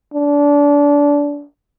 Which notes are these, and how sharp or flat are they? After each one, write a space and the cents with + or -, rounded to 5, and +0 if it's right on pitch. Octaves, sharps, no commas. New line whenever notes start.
D4 -25